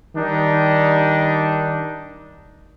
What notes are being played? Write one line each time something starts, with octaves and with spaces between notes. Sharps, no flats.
D#3 G3 D4 D#4